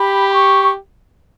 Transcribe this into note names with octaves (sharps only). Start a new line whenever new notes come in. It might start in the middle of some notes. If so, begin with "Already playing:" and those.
Already playing: G4 B5
C#6